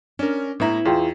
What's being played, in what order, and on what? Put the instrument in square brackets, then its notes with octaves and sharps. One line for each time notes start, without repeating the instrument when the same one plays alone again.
[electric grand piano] C#4 A#4 [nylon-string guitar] D4
[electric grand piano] A2 A#5 [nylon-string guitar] B3 E4
[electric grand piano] E2 [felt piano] F4 G#4 G5